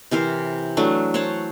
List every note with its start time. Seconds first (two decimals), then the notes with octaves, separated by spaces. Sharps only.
0.11 C3 E3 A#4 C5
0.77 E3 F#3 A3 D4
1.14 C5 C#5 F#5 A5